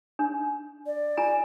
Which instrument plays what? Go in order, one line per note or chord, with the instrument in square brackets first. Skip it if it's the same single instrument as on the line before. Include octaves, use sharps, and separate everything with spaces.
[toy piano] D4
[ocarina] D5
[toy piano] F4 G#5 A#5